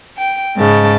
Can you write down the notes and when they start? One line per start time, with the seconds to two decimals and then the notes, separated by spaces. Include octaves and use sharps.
0.18 G5
0.57 G#2 C#3 A5